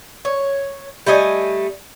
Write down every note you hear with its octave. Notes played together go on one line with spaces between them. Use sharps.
C#5
G3 A3 D#5 G#5